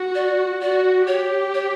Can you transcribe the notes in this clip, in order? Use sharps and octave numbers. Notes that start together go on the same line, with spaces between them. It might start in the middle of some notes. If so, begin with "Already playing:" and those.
Already playing: F#4
D5
F#4 D5
G4 C#5
C#5